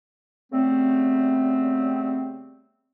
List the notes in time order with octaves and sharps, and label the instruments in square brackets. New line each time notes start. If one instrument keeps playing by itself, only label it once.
[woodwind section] C#3 G3 A3 B3 C4